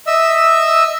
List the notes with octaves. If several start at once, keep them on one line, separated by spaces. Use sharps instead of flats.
D#5 E5 E6